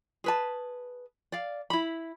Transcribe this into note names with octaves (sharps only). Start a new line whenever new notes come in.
G#4 B4 A5
D5 F5
E4 B5